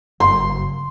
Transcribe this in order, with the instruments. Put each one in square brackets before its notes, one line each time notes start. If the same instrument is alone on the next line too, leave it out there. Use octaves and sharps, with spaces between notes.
[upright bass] F#1 G2 [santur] C6